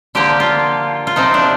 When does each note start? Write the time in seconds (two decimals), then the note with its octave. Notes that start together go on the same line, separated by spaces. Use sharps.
0.15 D3 F3 A#3 G4
0.40 F4
1.07 F4
1.16 C3 F3 C4 D#4
1.34 D4